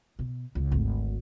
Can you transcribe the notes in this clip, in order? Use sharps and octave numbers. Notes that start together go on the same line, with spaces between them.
B2
C#2
G#1 D2